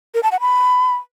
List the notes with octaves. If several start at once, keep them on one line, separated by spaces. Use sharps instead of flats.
A#4
A5
F#5
B5